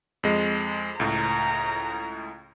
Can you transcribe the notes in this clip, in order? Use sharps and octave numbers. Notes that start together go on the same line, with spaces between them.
F2 G#3
C#2 A2 A#5